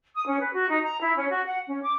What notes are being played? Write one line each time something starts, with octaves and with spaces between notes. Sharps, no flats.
D#6
C#4
B4
F#4
D#4
A#5
E4
C#4
F#4
F#5
C#4
D6